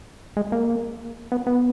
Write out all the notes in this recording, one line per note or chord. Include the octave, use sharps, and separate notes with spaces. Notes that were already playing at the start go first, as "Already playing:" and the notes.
G#3
A#3
B3
B3